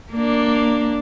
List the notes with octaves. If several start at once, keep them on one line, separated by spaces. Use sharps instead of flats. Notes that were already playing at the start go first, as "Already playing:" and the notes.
A#3 D4